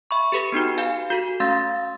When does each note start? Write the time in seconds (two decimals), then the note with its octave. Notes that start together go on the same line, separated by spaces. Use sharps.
0.11 E5 B5 C#6
0.32 G4 A4 B4 A#6
0.52 B3 D4 D#4 F#4
0.78 F#4 G4 F5 G#5
1.10 F#4 A4
1.40 A3 C#4 F5 C6 E6 A6